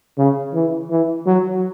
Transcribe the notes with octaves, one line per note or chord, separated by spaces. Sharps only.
C#3
E3
E3
F#3